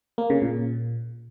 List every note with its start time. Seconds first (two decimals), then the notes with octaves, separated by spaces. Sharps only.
0.18 A#3
0.30 C#3
0.42 A#2